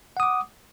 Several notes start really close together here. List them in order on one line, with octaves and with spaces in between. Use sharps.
F#5 D#6 D6